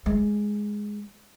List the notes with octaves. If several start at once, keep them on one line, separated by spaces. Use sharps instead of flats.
G#3